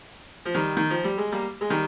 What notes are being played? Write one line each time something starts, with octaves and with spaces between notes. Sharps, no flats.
F3
D#3 G3
D#3
F3
G3
G#3
G3 A#3
G#3
D#3 G3